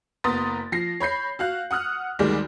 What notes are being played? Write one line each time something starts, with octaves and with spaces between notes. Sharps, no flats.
F#1 B3 A#5 C6 D#6 A6
F3 A#6 C7
C#5 B5 G6 C7
F#4 F5 F#6
F#5 D#6 F6 F#6
D2 D#3 G3 G#3 D5